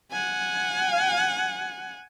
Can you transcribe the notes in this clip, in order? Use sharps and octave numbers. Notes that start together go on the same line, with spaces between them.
F#5 G#5